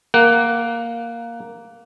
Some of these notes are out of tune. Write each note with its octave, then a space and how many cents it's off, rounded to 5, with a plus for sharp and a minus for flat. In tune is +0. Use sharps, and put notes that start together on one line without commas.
A#3 +0 F#5 +20